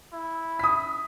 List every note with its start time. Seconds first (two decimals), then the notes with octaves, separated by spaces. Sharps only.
0.12 E4
0.59 D#6 B6